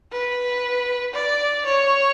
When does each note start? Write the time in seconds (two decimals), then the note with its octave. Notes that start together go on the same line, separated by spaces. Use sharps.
0.12 B4
1.14 D5
1.65 C#5